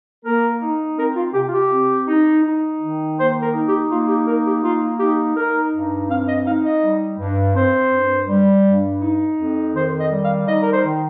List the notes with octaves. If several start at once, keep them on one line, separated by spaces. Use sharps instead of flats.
A#3 A#4
D#4
C4 A#4
F4
C3 G4
F4
G4
C4
D#4
D#4
D#3
A#3 C5
A#4
D#4
G4
A#3 F4
G4
D#4 A#4
G4
A#3 F4
D#4 G4
D#4 A#4
G2
C4 F5
D#5
D#4 F5
D#5
G3
G2
C4 C5
G2
G3
G2
D#4
F2
D#3 C5
D#5
G3
F5
D#4 D#5
A#4
C5
D#3